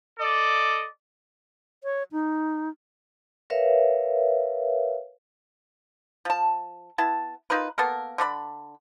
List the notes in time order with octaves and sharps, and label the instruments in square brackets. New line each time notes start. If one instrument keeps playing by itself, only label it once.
[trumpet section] A4 D5 D#5
[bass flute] C#5
D#4
[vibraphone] A#4 B4 C#5 E5 F5
[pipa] F3 A5
B3 E4 A5
D#4 F4 A#4 B4
A#3 B3 A4 A#4
D3 D4 D5 B5